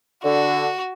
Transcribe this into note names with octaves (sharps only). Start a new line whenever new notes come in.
D3 F#4